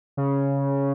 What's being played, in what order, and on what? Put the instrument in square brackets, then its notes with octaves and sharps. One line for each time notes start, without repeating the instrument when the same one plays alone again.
[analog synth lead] C#3